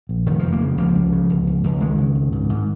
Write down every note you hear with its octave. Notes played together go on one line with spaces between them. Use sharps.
A#1
F1 D#3
F3
F1
F3 A#3
C#3
C#2 F3 A#3
C#2
C#3
C#2
C#2
C#2
C#2 D#3 G#3
C#3
C#2
G#2
G#2